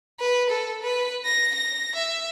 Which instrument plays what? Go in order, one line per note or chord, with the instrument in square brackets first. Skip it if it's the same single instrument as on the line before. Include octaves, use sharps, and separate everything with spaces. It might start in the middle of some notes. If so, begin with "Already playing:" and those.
[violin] B4
A4
B4
A#6
A#6
E5